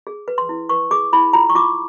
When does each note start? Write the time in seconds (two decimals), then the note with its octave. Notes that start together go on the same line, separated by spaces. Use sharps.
0.07 G#4
0.28 B4
0.38 C6
0.49 E4
0.69 B4 C#6
0.91 G#4 D6
1.13 E4 B5
1.33 F4 A#5
1.50 C#6
1.55 F4 D6